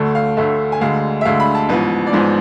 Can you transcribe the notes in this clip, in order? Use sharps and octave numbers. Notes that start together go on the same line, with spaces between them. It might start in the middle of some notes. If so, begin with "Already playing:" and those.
Already playing: D2 D3 A3
F5
D2 D3 A3 E5
G#5
D2 D3 G#3 F5
E5
D2 D3 G#3 F5
B5
A5
A1 G#2 F3 B3 B4
D5
A1 G#2 F3 B3 C5